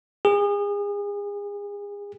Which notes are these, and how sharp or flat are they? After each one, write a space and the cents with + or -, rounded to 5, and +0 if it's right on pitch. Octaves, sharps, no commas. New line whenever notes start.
G#4 -35